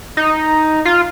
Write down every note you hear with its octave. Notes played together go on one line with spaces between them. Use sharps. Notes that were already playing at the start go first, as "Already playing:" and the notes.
D#4
F4